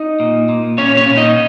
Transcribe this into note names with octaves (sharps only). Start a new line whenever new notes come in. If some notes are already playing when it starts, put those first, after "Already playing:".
Already playing: D#4 D#5
A#2
A#2
A#2 C#4 C#5
C#4 C#5
A#2
D#4 D#5